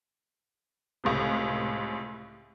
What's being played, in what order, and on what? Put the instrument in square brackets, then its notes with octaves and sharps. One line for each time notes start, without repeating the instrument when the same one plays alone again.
[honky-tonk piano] C#2 A2 C3